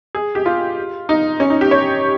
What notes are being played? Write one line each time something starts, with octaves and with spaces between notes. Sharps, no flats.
G#4
G4
F4
D#4
C#4
D#4
G4
C#5